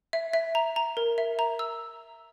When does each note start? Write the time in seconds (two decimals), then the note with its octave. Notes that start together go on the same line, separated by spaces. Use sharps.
0.13 E5
0.33 E5
0.55 A#5
0.76 A#5
0.97 A#4
1.18 E5
1.39 A#5
1.59 E6